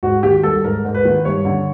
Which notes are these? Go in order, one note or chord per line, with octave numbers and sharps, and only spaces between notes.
G#2 F#4
D#3 G4
G3 A4
G#2 A#4
G#2
B4
D#3
G2 C#5
D3